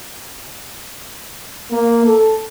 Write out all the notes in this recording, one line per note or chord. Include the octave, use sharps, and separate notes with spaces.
A#3
A4